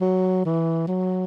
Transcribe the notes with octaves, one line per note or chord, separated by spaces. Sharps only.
F#3
E3
F#3